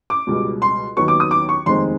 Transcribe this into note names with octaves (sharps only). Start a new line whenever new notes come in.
D6
C#2 B2 G3
C6
D#2 D#3 F#3 B3 C#6
D6
D#6
D6
C#6
F1 D#2 D#3 G#3 C4 C6